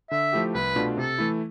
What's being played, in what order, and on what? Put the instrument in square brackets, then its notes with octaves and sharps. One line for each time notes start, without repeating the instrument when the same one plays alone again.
[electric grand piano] D3 [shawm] E5
[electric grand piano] F3 A3 E4 G4
[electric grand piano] C2 [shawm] B4
[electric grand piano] B2 A3 D4 F4
[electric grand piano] C3 [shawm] A4
[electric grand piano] E3 A3 E4